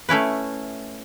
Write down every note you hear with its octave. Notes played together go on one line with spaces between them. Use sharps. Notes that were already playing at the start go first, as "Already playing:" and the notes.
A3 C#4 E4 B4